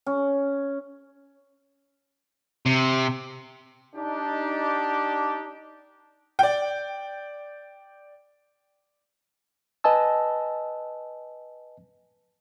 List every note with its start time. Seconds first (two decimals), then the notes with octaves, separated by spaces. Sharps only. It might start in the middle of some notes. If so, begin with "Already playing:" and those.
0.06 C#4
2.66 C3
3.96 D4 D#4 G4
6.39 D5 G5
9.84 B4 D#5 G#5 A5 E6